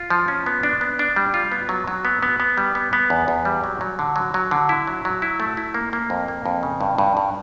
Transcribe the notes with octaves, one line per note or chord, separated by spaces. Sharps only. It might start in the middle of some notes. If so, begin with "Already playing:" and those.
Already playing: F4
F3
C#4
B3
D4
B3
D4
G3
F4
B3
F#3
F#3
B3
B3
B3
G3
B3
B3
E2
E2
G3
F#3
F#3
D3
F#3
F#3
D3
E4
F#3
F#3
E4
A3
E4
A#3
A#3
F2
A#3
F2
C#3
G2
G2
G2